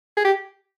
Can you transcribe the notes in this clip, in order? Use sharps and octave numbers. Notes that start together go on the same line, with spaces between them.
G#4
G4